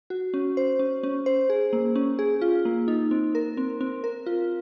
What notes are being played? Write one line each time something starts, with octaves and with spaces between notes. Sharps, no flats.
F#4
C#4
C5
C#4
C#4
C5
G#4
A#3
C#4
G#4
F4
A#3
D#4
C4
A#4
C4
C4
A#4
F4